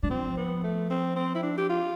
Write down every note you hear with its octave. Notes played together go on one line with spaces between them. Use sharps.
G3 D4
F3 C4
B3
A3
C4
C4
E4
D4
G4
F4